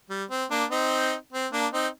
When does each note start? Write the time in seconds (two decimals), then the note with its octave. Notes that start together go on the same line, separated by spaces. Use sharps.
0.10 G3
0.30 C4
0.50 A#3 D4
0.70 C4 D#4
1.32 C4
1.53 A#3 D4
1.73 C4 D#4